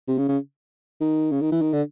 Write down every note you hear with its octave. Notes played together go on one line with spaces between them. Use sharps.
C3
C#3
C#3
D#3
C#3
D#3
E3
D#3
D3